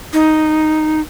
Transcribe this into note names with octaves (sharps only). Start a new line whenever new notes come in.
D#4